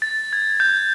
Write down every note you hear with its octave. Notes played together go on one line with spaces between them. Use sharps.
A6
G#6
G6